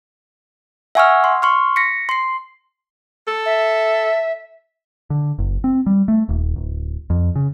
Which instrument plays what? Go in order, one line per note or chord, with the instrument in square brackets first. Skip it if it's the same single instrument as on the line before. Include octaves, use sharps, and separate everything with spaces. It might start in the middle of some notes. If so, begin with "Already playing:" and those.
[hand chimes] E5 F#5 G#5 C#6 E6 F6
C6
C6 C#6 F6
A#6 B6 C#7
C6 C7
[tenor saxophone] A4
[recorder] E5
[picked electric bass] D3
F#1
C4
G3
A3
D#1
D1
F2
C#3